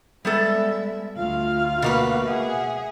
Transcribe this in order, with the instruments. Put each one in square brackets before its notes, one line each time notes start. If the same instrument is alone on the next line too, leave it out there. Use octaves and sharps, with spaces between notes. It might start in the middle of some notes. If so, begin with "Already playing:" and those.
[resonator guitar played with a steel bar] G3 B3 A4 [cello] G#3 E5
[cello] D2 F5 [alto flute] F4
[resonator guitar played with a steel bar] B2 A#3 B4 [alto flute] F#4
[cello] G#4 E5 [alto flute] F#5